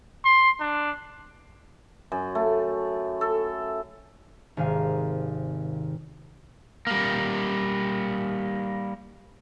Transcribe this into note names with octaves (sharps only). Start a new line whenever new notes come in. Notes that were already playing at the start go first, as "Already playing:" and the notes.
C6
D4
F#2
A3
A4
G#1 C3 D#3 F5 G#5
G3 A#3